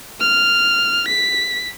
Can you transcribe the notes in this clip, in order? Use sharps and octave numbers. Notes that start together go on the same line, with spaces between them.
F6
B6